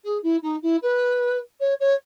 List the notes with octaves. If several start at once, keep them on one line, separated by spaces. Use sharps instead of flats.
G#4
E4
D#4
E4
B4
C#5
C#5